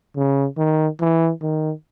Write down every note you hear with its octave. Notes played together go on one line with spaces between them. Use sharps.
C#3
D#3
E3
D#3